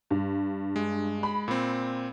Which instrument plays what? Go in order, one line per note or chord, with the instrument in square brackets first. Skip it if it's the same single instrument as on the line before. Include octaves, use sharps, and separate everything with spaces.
[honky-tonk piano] G2
[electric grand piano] G#3
[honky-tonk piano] B5
[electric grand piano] A#2 C4